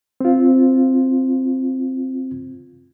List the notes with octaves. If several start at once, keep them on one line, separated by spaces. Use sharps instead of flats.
C4 F4